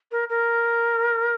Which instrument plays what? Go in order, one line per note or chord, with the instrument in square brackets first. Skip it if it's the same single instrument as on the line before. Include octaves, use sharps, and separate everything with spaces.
[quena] A#4
A#4